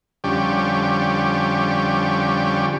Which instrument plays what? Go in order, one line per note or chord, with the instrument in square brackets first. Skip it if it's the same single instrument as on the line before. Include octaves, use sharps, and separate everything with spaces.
[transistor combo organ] F2 D3 G3 C#4 G4